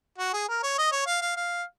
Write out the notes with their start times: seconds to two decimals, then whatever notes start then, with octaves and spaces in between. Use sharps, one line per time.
0.18 F#4
0.33 G#4
0.49 A#4
0.63 C#5
0.78 D#5
0.92 C#5
1.07 F5
1.21 F5
1.36 F5